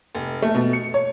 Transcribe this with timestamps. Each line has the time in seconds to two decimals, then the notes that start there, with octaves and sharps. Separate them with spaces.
0.15 F1
0.42 A3
0.55 B2
0.73 C#7
0.94 C#5